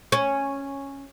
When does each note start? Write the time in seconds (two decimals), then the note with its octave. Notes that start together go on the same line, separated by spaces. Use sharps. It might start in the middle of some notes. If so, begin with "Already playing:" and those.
0.12 C#4